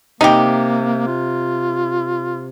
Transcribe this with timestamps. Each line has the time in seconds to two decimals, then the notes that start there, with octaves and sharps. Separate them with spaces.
0.21 C3 A#3 D#4 G4 E5 B5
1.08 F4